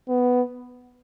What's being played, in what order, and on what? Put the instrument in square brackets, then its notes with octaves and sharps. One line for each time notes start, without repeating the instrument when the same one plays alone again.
[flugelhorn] B3